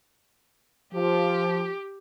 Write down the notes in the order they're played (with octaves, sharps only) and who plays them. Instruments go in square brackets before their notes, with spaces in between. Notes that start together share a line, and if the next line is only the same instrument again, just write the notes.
[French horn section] F3 [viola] G4